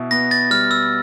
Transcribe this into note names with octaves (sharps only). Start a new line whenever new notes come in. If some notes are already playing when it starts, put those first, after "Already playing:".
Already playing: B2 E4
B3 A#6
A6
G3 F6
E6